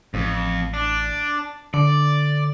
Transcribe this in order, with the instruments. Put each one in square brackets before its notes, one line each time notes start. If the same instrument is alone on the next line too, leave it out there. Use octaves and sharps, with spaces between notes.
[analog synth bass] A1 [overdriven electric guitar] F2
[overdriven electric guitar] D4
[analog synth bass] D3 [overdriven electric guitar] D5